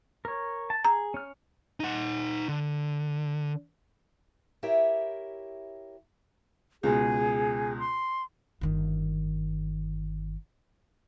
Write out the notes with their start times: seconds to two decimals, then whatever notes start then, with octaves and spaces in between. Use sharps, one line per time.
0.25 A#4 C#5
0.70 A5
0.84 G#4 A#5
1.14 C#4 F6
1.80 D#4 F#5
2.49 D3
4.63 E4 G4 A#4 C#5 E5
6.83 C#2 B2 G#4
7.79 C6
8.61 G1 D#3